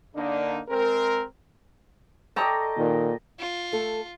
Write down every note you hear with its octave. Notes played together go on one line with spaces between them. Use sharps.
D3 A#3 D4 D#4
G#3 C4 A#4
A4 D5 D#5 G5 A#5 C#6
A#2 D#3
F4
A3 A4